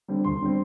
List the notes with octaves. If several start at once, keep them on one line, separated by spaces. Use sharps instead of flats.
D3 G3 C4
D2 C6
D3 G3 C4